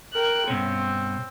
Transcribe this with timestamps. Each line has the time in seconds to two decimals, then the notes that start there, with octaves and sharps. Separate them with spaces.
0.13 A#4 G5 F#6
0.48 G2 B2 C4 C#4